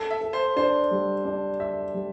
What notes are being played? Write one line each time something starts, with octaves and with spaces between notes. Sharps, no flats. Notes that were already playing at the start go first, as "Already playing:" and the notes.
Already playing: A4
E5
A4
C5
D4 C5
G3
D4
E5
G3